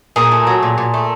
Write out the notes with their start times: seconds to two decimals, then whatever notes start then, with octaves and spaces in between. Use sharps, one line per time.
0.16 A#2 G#4 A#4
0.32 A3
0.47 F#3
0.63 A#2
0.78 A#2
0.94 A3